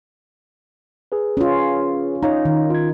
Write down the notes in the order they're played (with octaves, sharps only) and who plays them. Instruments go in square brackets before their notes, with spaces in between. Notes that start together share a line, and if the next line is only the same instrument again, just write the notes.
[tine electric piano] G#4 B4
[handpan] C#4 F4
[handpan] D#4 [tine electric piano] C#5 F5 A#5
[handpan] D#3
[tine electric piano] F4 G#6